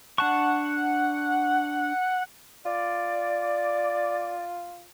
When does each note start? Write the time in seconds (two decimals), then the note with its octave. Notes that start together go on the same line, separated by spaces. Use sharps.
0.18 D4 F#5 A5 C#6
2.66 F4 D5